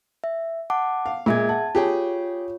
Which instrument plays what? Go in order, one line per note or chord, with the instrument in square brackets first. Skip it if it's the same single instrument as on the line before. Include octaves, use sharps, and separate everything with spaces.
[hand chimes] E5
F#5 A5 D6
[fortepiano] F5
[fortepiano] A#2 G#3 [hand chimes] G#4 E5 G#6
[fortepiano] F#5 [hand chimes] A5
[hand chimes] F4 C#5 [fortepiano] G4 G#4 G5